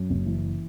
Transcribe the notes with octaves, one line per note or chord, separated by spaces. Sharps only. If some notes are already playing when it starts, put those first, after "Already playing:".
Already playing: F#2
F#1
E3